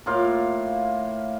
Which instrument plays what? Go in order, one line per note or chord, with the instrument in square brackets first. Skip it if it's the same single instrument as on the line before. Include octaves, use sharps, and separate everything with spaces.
[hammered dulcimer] A2 A#3 F4 F5